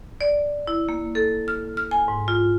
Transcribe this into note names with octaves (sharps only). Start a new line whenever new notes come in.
D5
E4
A#3
A4
F6
F6
G#5
G#2
F4